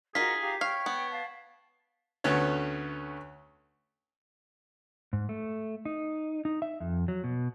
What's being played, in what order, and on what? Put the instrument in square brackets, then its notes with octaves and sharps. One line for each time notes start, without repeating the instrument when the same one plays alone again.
[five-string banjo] D#4 F4 [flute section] F#4 A#4 [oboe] G#4 [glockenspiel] B6
[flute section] G4 F5 A#5
[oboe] C#5 [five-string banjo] F5 [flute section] G5
[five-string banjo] B3
[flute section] F5 A5
[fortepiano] D2 A3 B3 C#4 C#5
[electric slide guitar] G#2
A3
D#4
D#4
E5
F2
F#3
B2